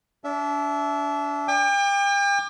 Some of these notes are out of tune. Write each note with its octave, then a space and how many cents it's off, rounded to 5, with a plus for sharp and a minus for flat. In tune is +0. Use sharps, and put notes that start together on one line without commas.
D4 -30 E5 +0
G5 +40 D6 +30